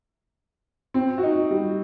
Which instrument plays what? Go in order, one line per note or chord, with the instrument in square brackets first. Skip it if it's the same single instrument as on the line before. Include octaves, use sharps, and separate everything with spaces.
[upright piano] C4
F#4
D#4
G3